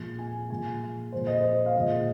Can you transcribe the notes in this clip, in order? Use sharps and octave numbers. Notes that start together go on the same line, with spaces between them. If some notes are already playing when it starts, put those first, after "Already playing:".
Already playing: A#2 F3 G#3
G#5
A#2 F3 G#3 G#5
A#2 F3 G#3 C5
D#5
C5
F5
A#2 F3 G#3 D#5